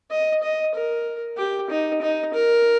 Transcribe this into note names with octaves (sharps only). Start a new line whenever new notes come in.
D#5
D#5
A#4
G4
D#4
D#4
A#4